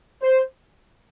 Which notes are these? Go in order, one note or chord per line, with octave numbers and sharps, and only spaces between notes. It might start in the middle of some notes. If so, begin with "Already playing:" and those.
C5